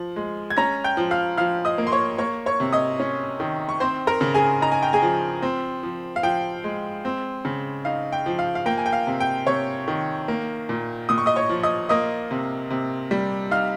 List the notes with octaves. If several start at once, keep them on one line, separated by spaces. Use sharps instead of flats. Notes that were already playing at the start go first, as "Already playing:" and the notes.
Already playing: F3
G#3
G#6
C#4 A#5 A#6
G5 G6
F3
F5 F6
F3 F5 F6
D#5 D#6
A#3
C6
C#5 C#6
A#3 C#5 C#6
C#5 C#6
C3
D#5 D#6
C#4
D#3
C#6
C4 C5 C6
A#4 A#5
C#3
G#4 G#5
D#4 A#5
G#5
G5
G#4 G#5
F3
C4
F3
F5
F3 G5
G#3
C4
C#3
D#4 F5
G5
F3
F5
F5
A#3 G5
G#5
G5
F5
C3
G5
C3 C#5 C#6
D#3
A#3
A#2
A#2 D#6
C#6
D#5 D#6
C#5 C#6
F3
D#5 D#6
A#3 D#5 D#6
C3
C3
G3
D#4 F5 F6